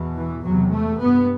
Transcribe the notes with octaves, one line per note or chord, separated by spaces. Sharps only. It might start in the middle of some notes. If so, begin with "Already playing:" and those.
Already playing: E2 B2
E3
E2 C3 F#3
A3
G2 B3